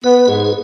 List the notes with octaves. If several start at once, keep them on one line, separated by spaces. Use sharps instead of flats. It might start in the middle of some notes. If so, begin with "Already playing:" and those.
B3 B4
G#2 G#4